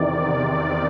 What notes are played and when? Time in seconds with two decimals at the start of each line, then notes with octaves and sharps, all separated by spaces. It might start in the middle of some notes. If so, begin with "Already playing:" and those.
Already playing: E2 C3 D#3 D5
0.50 D5